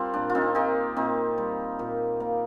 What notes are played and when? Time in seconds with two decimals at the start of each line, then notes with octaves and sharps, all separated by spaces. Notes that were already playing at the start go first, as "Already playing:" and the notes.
Already playing: G3 C4 F4 A#4 C5 D5
0.14 A#2 D4
0.30 F4
0.35 C4 D#4
0.55 A#3 D#4 G4
0.97 A#2 C4 D#4
1.38 G3
1.79 A#2
2.20 A#3